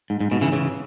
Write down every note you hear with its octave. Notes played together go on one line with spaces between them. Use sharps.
G#2
G#2
G#2 B2
C#3 E3
C#3 E3